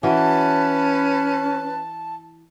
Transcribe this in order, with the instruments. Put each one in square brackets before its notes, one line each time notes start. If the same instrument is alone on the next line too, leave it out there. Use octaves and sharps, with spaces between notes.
[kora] E3 F#4 [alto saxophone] C#4 [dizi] B4 [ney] A5